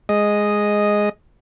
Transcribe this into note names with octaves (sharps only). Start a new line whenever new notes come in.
G#3 D#5